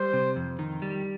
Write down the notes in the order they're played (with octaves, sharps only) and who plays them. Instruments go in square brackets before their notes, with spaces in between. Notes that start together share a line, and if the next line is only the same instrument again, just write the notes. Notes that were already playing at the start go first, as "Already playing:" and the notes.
Already playing: [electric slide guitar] G3 [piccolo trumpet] C5
[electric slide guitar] C3
F2
D#3
G3